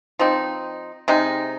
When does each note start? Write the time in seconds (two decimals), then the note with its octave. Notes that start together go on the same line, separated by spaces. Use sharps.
0.19 F3 C4 D#4
1.08 C3 G#3 D#4